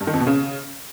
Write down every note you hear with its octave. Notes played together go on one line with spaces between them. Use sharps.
G2
D#3
F2
B2
C#3